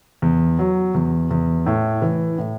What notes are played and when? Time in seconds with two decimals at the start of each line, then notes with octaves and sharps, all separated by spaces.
0.22 E2
0.59 F#3
0.94 E2
1.31 E2
1.66 A2
2.02 E3
2.38 A2